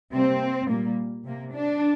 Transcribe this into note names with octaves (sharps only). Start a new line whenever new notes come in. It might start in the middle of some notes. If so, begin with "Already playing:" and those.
C3 G3 A#3 C4
A#2 G3 A#3
C3 A#3
D4